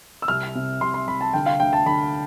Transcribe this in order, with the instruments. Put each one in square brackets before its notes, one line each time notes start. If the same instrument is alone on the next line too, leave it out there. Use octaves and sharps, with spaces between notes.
[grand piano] E6
C2 F6
C3
C2 C6
C6
C2 B5
A5
D3 G5
F5
D2 G5
A5
D3 B5